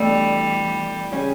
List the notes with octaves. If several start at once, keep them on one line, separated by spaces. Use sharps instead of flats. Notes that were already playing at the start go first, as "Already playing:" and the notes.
Already playing: B2 E3 G3 A3 D4
C#3 G3 C#4